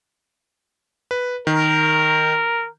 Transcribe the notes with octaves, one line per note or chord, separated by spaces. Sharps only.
B4
D#3 A#4